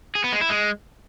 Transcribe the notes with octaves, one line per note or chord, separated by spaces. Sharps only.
G#4
B3
G#3
E4
G#3